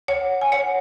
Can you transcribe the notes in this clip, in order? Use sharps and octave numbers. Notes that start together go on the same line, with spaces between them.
C#5 F#5
G#5
C#5 F#5